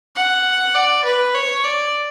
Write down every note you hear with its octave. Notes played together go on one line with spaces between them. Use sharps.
F#5
D5
B4
C#5
D5